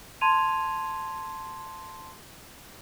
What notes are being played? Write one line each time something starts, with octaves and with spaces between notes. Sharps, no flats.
A5 C6 G#6 D#7 F7